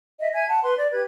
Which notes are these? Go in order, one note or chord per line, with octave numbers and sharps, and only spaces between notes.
D#5 E5
E5 G#5 G#6
F#5 A5
B4 C6
D5
G4 B4 G#6